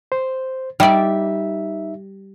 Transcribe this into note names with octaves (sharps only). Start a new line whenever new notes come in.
C5
G3 D#4 D5 E5